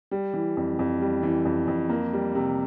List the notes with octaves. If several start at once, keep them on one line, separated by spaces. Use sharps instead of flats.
G3
E3
F2
F2
G3
E3
F2
F2
A#3
G3
C3